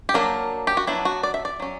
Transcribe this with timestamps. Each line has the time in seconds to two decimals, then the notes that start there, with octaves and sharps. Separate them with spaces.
0.09 G4
0.14 F#3 A#3 D4 A#4
0.67 G4
0.77 F#4
0.87 F#3 B3 D4 E4
1.05 F#4
1.23 D5
1.34 E5
1.45 D5
1.60 F#3 C#4